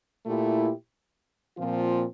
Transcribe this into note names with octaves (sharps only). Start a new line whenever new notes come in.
A#2 A3 E4 G4
A#2 F3 C4 F4